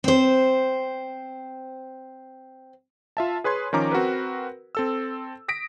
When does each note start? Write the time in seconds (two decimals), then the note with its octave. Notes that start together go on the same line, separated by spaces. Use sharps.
0.04 C4 C5
3.17 F4 E5 A5
3.44 G#4 B4 C#5 C6 G#6
3.73 D#3 F3 C#4 A#5 D6
3.92 C4 F#4 A#4 B4
4.75 C4 A4 E6
5.48 D#6 A#6 B6 D7